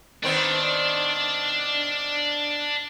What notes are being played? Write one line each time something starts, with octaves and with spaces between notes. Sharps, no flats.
D#3 B3 C4 D4 D5